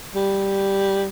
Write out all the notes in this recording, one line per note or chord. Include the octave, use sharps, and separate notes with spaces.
G3